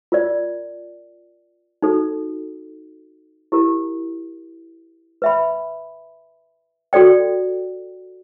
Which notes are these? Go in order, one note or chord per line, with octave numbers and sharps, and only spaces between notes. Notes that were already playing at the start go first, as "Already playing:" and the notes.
F4 A#4 D5
D#4 F#4 A4
E4 G4 A#4
B4 E5 G5 B5
F#4 A4 D5 G5